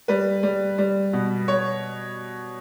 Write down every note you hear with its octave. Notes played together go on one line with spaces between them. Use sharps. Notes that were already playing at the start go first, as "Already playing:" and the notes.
G3 B4
G3
G3
B2
C#5